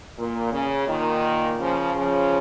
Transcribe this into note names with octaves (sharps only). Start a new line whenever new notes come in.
A#2
C#3
A#2 D#3
C#3 F3
C#3 F3